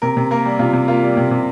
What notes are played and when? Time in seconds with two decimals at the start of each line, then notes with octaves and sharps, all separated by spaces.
0.02 C3 A#4
0.17 C3
0.31 A#3 A#4
0.45 G3
0.59 C3 F4
0.73 C3
0.88 A#3 F4
1.03 G3
1.17 C3
1.31 C3